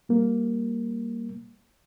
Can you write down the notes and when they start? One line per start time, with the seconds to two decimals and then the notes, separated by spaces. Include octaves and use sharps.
0.09 G3 A#3